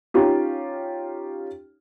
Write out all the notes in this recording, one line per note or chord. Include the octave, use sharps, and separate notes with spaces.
C#4 D#4 F4 G4